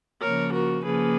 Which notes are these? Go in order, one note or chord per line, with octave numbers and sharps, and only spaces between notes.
C#3 F3 A#3 A#4 C#5
F#4 A#4
C#3 F3 A#3 G#4 B4